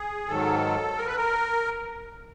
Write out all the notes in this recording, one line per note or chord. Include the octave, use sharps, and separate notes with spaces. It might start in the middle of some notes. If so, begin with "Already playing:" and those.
Already playing: G#4
G#2 D#3 F#3 A4
A#4
B4
A#4